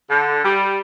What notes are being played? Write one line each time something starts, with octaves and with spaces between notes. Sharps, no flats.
D3
G3